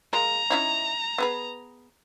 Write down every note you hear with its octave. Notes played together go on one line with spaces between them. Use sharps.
G#3 F4 A#4 A#5
C#4 D#4 E4
B3 G#4 B4